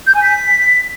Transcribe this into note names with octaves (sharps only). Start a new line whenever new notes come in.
G6
G#5
B6